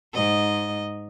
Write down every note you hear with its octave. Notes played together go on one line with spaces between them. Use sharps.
G#2 D#5